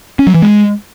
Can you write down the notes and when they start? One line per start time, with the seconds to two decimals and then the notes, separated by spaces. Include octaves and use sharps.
0.19 C#4
0.27 F#3
0.34 E3
0.42 G#3